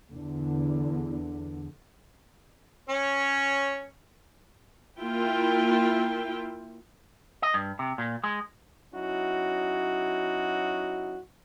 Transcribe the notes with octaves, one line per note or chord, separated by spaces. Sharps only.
E2 D3
C#4 C#5
A#3 E4 F4 A#4 E5 G5
D#5
G2
C3
A#2
G#3
F#3 C#4 D#4 E4 F#4